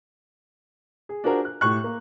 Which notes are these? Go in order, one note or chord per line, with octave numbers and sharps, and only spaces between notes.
G#4
D4 F4 F#4 G#4 A#4 C5
F#6
A2 G4 C#6 F#6
A#3